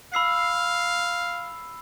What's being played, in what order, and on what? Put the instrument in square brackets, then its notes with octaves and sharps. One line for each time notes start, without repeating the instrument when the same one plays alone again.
[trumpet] F5 [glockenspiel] B5 E6 C7